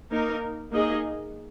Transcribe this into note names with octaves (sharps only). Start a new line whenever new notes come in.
A#3 D#4 A#4
A#3 D#4 G#4 D#5